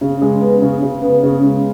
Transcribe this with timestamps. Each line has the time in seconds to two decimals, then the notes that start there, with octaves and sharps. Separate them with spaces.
0.01 C#3
0.22 G#3
0.41 B3
0.62 C#3
0.83 C#3
1.02 B3
1.23 C#3
1.43 G#3